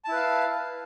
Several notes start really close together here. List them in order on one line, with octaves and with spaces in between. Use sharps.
A5 E4 B4 F5